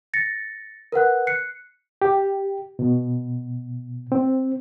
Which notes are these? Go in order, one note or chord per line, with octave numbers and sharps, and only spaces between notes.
A6 A#6 C#7
A#4 B4 F#5 F#6
F#6 C7 C#7
G4
B2
C4